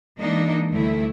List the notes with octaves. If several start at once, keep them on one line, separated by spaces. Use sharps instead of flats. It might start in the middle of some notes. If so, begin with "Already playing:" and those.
E3 G#3 A#3 D4 D#4
D2 G3 A3 E4